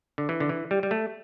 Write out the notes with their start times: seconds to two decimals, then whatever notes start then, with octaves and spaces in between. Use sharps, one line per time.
0.18 D3
0.29 E3
0.40 D3
0.49 E3
0.71 G3
0.83 G3
0.91 A3